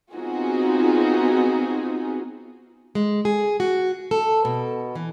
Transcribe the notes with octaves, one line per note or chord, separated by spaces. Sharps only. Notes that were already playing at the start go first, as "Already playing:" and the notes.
B3 C4 D#4 F4 F#4 G#4
G#3
G#4
F#4
A4
B2
E3